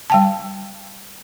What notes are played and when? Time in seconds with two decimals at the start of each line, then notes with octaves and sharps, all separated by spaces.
0.10 G3 G5 A5